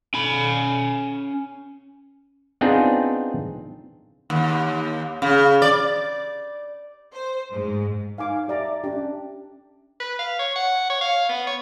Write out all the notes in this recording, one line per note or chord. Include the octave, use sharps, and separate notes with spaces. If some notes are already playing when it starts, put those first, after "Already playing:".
C#4 B5
B3 C4 D4 D#4 F4 G#4
D#2
C#3
D5
C5
G#2
D#4 F5 G#5 D6
G4 D5 E5 A#5
C#4 D4 G4
B4
F5
C#5
F#5
C#5
F5
B3
C#5